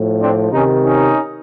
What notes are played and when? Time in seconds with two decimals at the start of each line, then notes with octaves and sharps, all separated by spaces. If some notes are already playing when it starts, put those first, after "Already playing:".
Already playing: A2 F3
0.22 C4 D4
0.52 C3 D#3 C#4 D#4
0.84 C#4 D#4